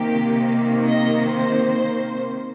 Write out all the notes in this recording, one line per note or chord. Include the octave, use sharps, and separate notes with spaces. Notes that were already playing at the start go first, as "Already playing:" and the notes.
Already playing: C3 D#3 A#3 G4
D#5
C5